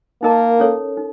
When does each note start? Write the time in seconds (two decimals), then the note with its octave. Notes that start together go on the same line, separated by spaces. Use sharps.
0.22 A#3 D#4 A#4 D#5 A5
0.60 C#4 A4 C#5
0.97 D#4